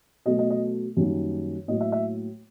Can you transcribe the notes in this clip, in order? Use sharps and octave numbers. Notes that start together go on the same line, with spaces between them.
B2 F#3 A3 D#5
D#5
D#5
F#2 D#3 G3 A#3 D#4
A2 F#3 A#3 D#5
E5
E5